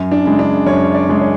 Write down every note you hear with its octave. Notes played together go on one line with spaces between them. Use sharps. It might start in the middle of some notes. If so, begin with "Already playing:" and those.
Already playing: F#2
D4
C#3 G#3
D4
F#2 C#5
D5
C#3 G#3
C#5